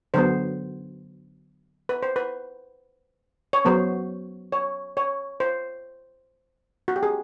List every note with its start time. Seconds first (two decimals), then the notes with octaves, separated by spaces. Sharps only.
0.14 D3 F#3 B3 C5
1.89 B4
2.03 C5
2.16 B4
3.53 C#5
3.65 F#3 B3 C5
4.52 C#5
4.97 C#5
5.40 C5
6.88 F#4
6.96 G4
7.03 G#4